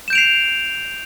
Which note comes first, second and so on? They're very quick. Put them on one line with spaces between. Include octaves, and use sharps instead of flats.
E7 G6 D7 F7 C7